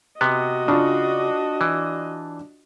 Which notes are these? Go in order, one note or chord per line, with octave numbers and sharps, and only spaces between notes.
C3 B3 F#4 D#5
C#3 D4 F4
E3